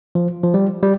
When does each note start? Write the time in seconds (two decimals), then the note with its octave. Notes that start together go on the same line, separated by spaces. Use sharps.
0.15 F3
0.43 F3
0.54 G3
0.83 G3